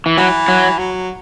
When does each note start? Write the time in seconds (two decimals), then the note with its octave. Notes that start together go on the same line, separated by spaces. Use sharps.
0.06 E3
0.18 E3 F#3
0.48 F#3
0.79 F#3